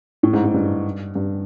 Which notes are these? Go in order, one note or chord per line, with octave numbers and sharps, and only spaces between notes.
A2
G#2
G#2
G2
G2